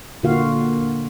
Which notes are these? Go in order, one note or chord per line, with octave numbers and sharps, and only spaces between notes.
A#2 D3 A#3 F4 F#4 F5